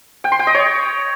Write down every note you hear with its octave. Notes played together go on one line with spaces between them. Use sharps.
G5
C6
G5
D#5
C#5